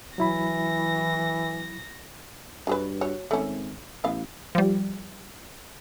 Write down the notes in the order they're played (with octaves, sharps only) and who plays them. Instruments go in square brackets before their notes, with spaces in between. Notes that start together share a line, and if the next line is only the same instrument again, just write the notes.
[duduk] E3 [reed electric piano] F#3 E4 B5 [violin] A#6
[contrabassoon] G2 [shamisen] F#3 G#4 B4
[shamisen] F#4 C#5
[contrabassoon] G#1 [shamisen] A3 C#4
[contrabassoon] A1 [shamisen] B3 F5
[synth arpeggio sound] F3 G3